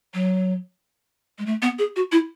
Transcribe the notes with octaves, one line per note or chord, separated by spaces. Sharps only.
F#3
G#3
A3
B3
G#4
F#4
E4